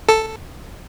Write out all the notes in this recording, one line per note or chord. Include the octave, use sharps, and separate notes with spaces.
A4